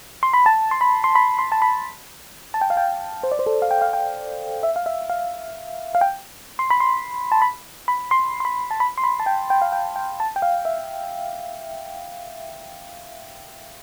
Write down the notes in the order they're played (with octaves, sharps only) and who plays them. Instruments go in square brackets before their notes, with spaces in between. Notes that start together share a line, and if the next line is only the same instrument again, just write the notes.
[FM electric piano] C6
B5
A5
C6
B5
C6
B5
C6
A5
B5
A5
G5
F5
G5
C5
D5
C5
A4
F5
G5
F5
G5
E5
F5
E5
F5
F5
G5
C6
B5
C6
A5
B5
B5
C6
C6
B5
A5
B5
C6
B5
A5
G5
G5
F5
G5
G5
A5
G5
F5
E5